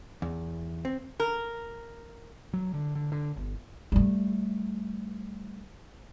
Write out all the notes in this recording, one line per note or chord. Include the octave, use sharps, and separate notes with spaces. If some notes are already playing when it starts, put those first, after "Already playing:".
E2
C4
A#4
F#3
D3
D3
D3
G1
G3 A3